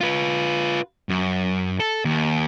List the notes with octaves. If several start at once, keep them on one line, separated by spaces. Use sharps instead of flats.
F4 B4
F#2
A4
D#2